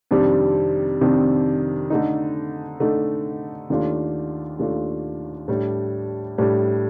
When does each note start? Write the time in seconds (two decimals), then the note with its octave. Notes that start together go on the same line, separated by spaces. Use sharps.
0.11 F2 C3 D#3 G3 D4
1.01 F2 C3 D#3 G3 D4
1.90 D3 A3 D#4
2.80 D3 A3 D#4
3.70 D#2 D#3 A3 D4 F4
4.59 D#2 D#3 A3 D4 F4
5.48 A2 G3 D4
6.38 A2 G3 D4